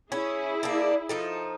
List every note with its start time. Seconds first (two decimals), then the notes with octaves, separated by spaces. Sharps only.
0.12 C#4 E4 G#4
0.63 A#3 D4
1.09 F3 D#4 A4